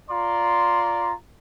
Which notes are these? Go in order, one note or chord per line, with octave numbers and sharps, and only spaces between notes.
F4 D5 A#5 C6